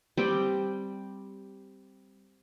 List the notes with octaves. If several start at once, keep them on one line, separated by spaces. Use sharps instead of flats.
G3 C4 G5